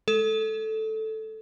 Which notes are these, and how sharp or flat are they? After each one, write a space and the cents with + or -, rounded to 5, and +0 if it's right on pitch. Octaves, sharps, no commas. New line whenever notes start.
G#3 +35 A4 +0